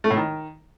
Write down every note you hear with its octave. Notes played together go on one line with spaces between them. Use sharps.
A3
A2
D#3